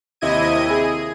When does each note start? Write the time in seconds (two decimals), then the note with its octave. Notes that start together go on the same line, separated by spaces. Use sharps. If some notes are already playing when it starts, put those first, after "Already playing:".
0.21 D#2 C3 E4 D#5 G#6 D#7
0.70 G#4